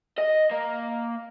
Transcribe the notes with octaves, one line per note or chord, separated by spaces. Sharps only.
D#5
A#3